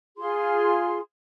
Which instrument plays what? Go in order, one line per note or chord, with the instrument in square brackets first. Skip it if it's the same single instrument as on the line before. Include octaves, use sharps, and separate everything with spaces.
[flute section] F4 G#4 C6